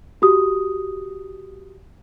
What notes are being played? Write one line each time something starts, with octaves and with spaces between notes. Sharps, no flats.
F#4 G4 D#6